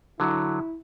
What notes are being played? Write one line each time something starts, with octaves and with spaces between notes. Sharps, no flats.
D3 F#3 E4